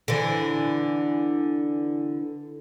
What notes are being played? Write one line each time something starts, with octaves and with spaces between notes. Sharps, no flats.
D3 E3